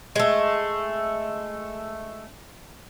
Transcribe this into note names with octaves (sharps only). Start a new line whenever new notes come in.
G#3 A3